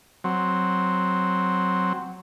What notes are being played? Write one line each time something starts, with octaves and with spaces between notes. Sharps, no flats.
F#3 C4